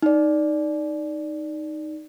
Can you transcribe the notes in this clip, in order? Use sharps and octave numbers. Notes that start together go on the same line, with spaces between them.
D#4 D5